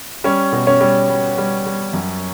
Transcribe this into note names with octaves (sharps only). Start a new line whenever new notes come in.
G3 C#4 C#5
B2
C#4 C#5
G3
G3
G3
G3
F#2